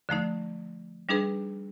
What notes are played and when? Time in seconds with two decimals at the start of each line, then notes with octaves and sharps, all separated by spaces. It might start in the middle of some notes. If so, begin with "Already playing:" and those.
0.09 D3 F3 A3 D#4
1.09 G3 D4 D#4 G#4 B4